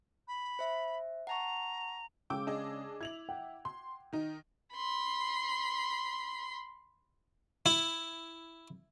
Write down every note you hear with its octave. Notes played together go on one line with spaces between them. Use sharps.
B5
C5 E5
F#5 A5 A#5 C#6
C#3 G#3 G5 D6 E6
D4 G#4 D#5
E4 G#6 F7 F#7
F#5 G5
C6
D#3 D#4
B5 C6
E4